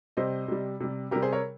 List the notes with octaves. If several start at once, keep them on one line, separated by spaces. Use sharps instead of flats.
C3 G3 C5 D#5
C3 G3
C3 G3
C3 G3 G4 A#4
G#4 C5
A#4 C#5